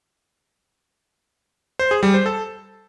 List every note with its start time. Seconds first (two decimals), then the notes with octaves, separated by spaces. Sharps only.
1.79 C5
1.91 G#4
2.03 G3
2.14 C5
2.26 A4